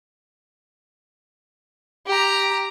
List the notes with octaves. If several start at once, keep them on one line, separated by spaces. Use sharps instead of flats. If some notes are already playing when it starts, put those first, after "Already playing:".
G4 A#5